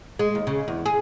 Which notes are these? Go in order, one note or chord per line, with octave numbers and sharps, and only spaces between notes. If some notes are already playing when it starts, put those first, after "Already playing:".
G#3
D#2
C#3
E2
G#4